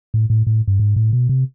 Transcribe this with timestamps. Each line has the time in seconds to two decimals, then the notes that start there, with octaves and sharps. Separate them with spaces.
0.14 A2
0.30 A2
0.47 A2
0.68 G2
0.80 G#2
0.96 A2
1.13 B2
1.29 C3